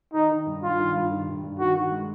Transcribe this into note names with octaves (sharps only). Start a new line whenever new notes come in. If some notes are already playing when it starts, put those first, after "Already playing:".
D#3 D#4
D#3
G2
G2 F4
D#3
G2
D#3
G2
G2
D#3 F#4
D#3
G#3